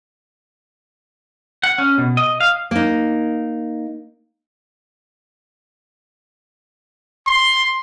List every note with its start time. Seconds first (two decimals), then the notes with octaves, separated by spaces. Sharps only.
1.63 F#5
1.78 C#4
1.98 B2
2.17 D#5
2.40 F5
2.71 A#3 D#4
7.27 C6